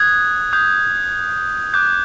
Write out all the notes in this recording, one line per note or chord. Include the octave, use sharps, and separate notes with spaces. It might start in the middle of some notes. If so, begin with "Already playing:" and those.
Already playing: D#6 F#6 G#6
D#6 G6
D6 F#6 G6